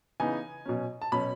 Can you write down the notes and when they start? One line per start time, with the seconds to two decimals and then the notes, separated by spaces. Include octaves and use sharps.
0.20 C#3 E3 B3 D#4 G#5
0.66 B2 F#3 C#4
1.02 A5
1.12 B2 F#3 C#4 B5